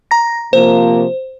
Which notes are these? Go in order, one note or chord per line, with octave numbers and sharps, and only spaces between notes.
A#5 A#6
C3 F3 A#3 C5